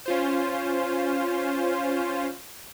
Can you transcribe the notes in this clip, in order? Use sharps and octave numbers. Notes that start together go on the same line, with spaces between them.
C#4 F4 C5